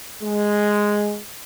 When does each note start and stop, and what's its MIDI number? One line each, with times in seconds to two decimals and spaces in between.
0.22 1.18 56